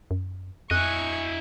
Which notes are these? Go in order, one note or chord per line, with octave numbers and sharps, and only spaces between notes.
F#2
F2 E4 D#5 G#5 C#6 F#6